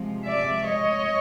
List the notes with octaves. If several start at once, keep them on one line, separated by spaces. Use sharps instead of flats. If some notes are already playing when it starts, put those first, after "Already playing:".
Already playing: C3 F3 G#3
D5 E5
C#5 D#5